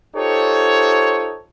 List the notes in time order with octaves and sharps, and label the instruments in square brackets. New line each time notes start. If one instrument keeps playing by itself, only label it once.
[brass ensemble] D#4 F4 G4 A4 C5 C#5